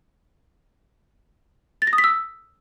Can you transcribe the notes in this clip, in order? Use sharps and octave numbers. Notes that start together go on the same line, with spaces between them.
A6
A#6
D#6
B6
E6